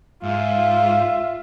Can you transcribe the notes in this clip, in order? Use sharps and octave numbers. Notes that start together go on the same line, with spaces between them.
G#2 F4 E5